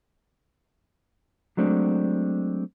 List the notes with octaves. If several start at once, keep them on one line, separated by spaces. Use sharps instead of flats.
F#3 G#3 A3 C4 D4